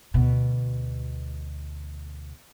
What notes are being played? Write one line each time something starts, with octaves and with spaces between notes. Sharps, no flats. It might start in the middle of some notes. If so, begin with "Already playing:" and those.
D2 B2